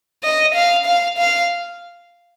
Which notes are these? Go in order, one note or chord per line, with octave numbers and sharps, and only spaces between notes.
D#5
F5
F5
F5